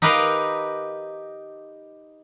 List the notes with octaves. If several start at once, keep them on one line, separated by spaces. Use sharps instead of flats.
D#4 G4 A#4 B4 D#5 F5